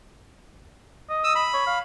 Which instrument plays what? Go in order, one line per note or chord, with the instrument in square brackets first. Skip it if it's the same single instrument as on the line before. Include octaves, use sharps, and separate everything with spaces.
[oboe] D#5
[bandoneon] D#6 E6
B5
[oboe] C#5
F5